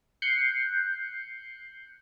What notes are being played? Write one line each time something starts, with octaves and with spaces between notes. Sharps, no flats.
F#6 G6 C7 C#7